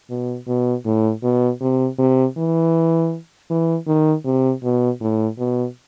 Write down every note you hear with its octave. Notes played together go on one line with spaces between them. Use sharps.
B2
B2
A2
B2
C3
C3
E3
E3
D#3
C3
B2
A2
B2